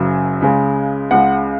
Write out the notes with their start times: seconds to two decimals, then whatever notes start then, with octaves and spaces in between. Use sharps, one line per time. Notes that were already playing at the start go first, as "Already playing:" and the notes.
Already playing: F#1 F#2 C#3 F#3
0.41 C#2 C#3 G#3
1.11 C#2 C#3 G#3 F#5